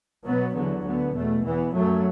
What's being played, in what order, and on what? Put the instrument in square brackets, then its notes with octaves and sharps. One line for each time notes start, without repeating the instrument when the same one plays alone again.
[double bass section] B2 F#3 B3
E2 D3 F#3 B3
D2 D3 B3
E2 B2 A3
E2 E3 B3
F#2 F#3 A3